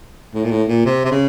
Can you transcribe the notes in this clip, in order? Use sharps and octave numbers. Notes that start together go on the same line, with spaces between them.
A2
A#2
A2
A#2
C3
C3
C#3